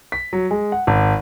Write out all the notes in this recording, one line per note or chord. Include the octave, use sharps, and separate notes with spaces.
B6
F#3
G#3
F#5
G#1